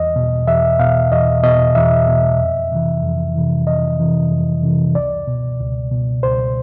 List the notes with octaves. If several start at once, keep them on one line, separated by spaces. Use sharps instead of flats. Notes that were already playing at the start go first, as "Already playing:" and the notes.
Already playing: E2 D#5
B2
E2 E5
B2 F5
E2 D#5
B2 D#5
E2 E5
B2
F2
C3 E3
F2
C3 E3
F2 D#5
C3 E3
F2
C3 E3
C#2 D5
B2
C#2
B2
C#2 C5